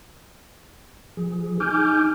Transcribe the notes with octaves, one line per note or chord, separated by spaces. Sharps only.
F3 G#4
D#4 G#5 D6 F6 G6